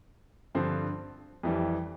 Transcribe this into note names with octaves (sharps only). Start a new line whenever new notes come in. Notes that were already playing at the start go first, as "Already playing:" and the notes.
G2 D3 F3 C4
F2 E3 G3